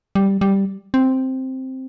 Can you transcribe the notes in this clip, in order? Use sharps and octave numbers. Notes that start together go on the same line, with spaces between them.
G3
G3
C4